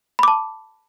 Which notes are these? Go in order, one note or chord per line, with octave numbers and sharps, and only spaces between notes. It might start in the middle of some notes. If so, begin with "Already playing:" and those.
A5 B5 D6